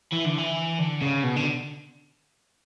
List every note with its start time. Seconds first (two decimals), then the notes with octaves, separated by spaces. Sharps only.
0.13 E3
0.26 D3
0.38 E3
0.79 D3
1.02 C#3
1.24 B2
1.36 D3